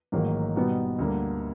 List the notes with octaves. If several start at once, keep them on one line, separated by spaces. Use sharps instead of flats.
A1 G#2 D#3 F#3 A#3
B2 G3 B3 D#4 F#4
D2 D3 G3 A#3